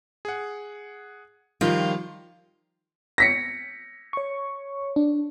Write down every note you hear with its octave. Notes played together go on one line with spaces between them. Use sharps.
G#4 F#5
D#3 F3 G3 F4
A#6 B6 C#7
C#5 C#6
D4